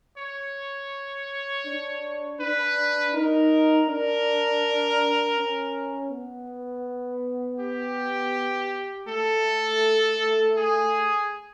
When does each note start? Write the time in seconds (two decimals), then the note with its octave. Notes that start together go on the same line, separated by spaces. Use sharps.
0.17 C#5
1.66 D4
2.39 D4 B4
3.14 D#4 A#4
3.89 D4 A#4
5.37 C#4
6.10 B3
7.59 G4
9.08 A3 A4
10.57 G#4